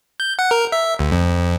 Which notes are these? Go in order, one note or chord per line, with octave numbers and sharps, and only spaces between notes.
G6
F#5
A#4
E5
D2
F2